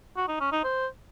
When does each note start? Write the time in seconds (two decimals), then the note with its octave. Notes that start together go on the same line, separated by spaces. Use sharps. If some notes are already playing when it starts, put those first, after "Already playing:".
0.16 F#4
0.28 D#4
0.40 C#4
0.52 D#4
0.64 C5